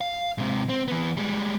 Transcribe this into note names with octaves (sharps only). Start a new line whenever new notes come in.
F5
G#2 C3
C4
E3 B3
G3 G#3